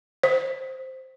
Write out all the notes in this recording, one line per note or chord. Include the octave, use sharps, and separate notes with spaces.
C5